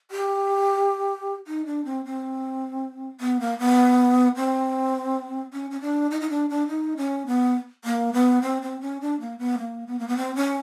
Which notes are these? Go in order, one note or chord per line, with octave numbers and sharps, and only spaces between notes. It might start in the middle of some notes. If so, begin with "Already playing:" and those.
G4
D#4
D4
C4
C4
B3
A#3
B3
C4
C#4
C#4
D4
D#4
D#4
D4
D4
D#4
C#4
B3
A#3
B3
C4
C4
C#4
D4
A#3
B3
A#3
B3
A#3
B3
C4
C#4